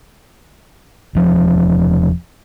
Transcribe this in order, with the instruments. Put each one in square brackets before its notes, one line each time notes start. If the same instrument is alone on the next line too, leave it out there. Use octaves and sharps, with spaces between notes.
[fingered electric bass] E1 F3